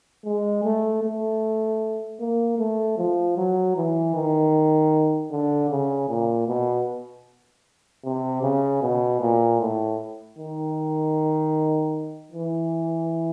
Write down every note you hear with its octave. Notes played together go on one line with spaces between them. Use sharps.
G#3
A3
A3
A#3
A3
F3
F#3
E3
D#3
D3
C#3
A#2
B2
C3
C#3
B2
A#2
A2
D#3
E3